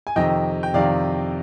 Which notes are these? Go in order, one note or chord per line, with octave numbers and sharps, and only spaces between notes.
G#5
F2 C3 D#3 D#5 G5
G5
F2 C3 D#3 D5 F5